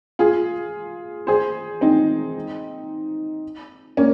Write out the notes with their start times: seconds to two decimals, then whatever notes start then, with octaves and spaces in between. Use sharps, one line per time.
0.19 F4 G#4
1.27 G#4 C5
1.81 C4 D#4
3.97 A#3 C#4